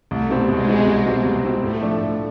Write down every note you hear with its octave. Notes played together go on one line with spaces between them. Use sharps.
C2 A3
B2 G3 C4
C2 G#3
B2 G3 C4
C2
B2 G3 C4
C2
B2 G3 C4
A2 A3
F3 A3 D4
A2